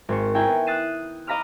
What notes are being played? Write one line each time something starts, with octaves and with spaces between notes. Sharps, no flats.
G#1 C5 C#6
E4 G5 G#5 A#5
B3
D#6 F#6 A6 C7 D#7 E7
D#5 F5 A#5 B5 D6 F6